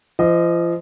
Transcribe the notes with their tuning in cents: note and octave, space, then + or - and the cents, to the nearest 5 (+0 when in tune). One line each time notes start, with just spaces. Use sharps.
F3 -35 D#5 +0